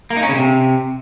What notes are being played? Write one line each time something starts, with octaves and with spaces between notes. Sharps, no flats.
A#3
D#4
C#4
C#3
C3